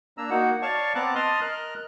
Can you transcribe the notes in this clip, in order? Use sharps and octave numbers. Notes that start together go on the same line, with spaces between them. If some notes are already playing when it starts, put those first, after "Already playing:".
A#3 D4 A#5 E6
A#3 D#4 F#4 F#5
C#5 D5 F5 A5 C#6
B3 C4 A5 A#5 D6 F#6
D#5 A5 C6 D#6 F6
A#4 D#5 F6 F#6